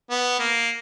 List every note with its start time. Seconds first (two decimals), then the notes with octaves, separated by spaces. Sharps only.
0.10 B3
0.39 A#3